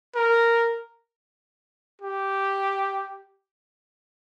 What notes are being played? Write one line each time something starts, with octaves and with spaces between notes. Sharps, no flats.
A#4
G4